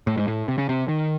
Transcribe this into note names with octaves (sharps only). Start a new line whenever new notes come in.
A2
G#2
A2
C3
C#3
C3
D#3